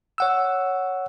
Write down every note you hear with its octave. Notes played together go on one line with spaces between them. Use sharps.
C#5 F#5 E6